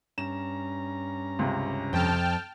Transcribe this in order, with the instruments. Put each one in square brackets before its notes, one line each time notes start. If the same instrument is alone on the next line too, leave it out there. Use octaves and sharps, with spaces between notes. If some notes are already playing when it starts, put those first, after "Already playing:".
[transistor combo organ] G2 C#4 A#5 [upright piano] E7
[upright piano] C#2 C3
[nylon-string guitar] F2 [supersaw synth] G5 A5 F6